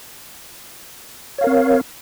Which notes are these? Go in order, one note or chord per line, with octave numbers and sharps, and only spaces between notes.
C4 A#4 C#5 F5